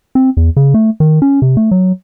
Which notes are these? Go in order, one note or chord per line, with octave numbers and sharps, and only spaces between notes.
C4
E2
C#3
A3
D#3
C#4
C3
A3
F#3